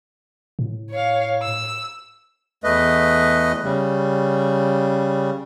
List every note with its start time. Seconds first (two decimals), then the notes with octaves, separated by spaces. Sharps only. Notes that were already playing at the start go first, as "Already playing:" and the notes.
0.59 A2
0.91 C#5 F5
1.42 E6
2.64 E2 A3 B4 D#5
3.64 C#3 G3